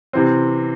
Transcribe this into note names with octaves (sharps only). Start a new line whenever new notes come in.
C3 E3 C4